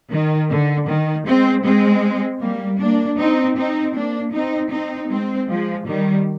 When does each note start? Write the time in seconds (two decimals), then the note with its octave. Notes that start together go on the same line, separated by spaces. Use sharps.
0.12 D#3
0.50 D3
0.89 D#3
1.27 G#3 C4
1.65 G#3 C4
2.42 G3 A#3
2.80 A#3 D4
3.18 C4 D#4
3.57 C4 D#4
3.95 A#3 D4
4.33 C4 D#4
4.71 C4 D#4
5.10 G#3 C4
5.48 F3 G#3
5.87 D#3 G3